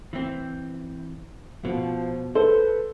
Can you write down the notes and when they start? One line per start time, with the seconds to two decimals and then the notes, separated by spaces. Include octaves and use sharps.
0.13 E3 C4
1.65 B2 F3
2.35 A4 B4 C5